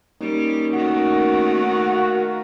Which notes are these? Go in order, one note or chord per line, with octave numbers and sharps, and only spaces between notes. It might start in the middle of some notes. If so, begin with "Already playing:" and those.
G3 A#3 C#4 D#4
D#3 A3 F#4
A#4 F5